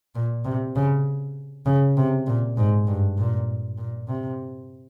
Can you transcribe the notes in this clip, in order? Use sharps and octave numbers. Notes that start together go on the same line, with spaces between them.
A#2
C3
C#3
C#3
C3
A#2
G#2
G2
A#2
A#2
C3